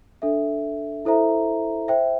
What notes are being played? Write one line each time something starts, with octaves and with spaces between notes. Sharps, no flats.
D4 A4 E5
E4 A4 C5 E5 A#5
C5 E5 G5